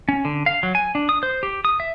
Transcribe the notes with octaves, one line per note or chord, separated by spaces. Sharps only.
C#4
D3
F5
F#3
G#5
D4
D#6
C5
G4
D#6
E5